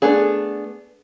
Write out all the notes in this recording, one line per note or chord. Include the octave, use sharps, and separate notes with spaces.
A3 B3 D4 G#4